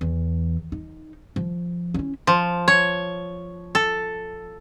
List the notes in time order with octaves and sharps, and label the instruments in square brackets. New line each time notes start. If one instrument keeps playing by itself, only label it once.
[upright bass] E2
D#4
F3
C#4 E4
[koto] F3
C#5
A4